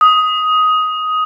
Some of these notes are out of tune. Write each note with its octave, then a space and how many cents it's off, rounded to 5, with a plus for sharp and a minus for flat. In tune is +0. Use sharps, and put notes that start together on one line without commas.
D#6 +10